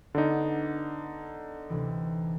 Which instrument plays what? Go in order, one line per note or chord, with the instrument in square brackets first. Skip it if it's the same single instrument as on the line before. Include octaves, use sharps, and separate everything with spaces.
[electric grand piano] D3 D#4 [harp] B3 D4 D5
[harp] D2 C3 E3